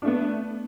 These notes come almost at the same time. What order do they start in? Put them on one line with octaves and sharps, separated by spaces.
D4 A3 B3